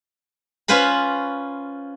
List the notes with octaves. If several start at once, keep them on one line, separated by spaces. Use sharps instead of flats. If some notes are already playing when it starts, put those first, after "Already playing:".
C#4 F4 B4 C5 B5